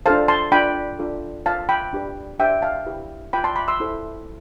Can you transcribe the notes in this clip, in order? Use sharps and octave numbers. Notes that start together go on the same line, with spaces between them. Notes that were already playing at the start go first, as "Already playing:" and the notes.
D4 F4 A4 C5 F5 A5
A5 C6
D4 F4 B4 G5 B5
D4 F4 A4
F4 C5 F5 A5
G5 B5
D4 G4 B4
D4 G4 C5 E5 G5
F5 A5
E4 G4 B4
F4 B4 G5 B5
A5 C6
B5 D6
C6 E6
E4 A4 C5